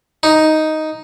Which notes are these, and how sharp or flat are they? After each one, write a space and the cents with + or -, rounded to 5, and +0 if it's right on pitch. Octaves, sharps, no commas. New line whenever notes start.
D#4 +5